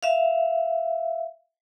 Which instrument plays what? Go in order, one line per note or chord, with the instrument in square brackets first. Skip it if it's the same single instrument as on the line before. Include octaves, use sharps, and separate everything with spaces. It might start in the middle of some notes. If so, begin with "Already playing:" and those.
[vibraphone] E5 F5